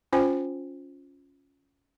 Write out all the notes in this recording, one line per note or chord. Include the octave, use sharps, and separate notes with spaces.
C#4 F4 C5 G5 G#5